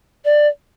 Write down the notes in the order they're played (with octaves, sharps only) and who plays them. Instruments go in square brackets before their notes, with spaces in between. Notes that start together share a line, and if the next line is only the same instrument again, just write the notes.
[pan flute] D5